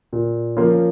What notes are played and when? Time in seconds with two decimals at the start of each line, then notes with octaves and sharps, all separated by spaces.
0.13 A#2
0.57 F3 A#3 C#4 F4